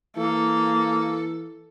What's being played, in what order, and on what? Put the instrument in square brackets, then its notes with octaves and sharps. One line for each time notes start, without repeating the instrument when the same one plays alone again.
[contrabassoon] E3 [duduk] A#3 [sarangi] A4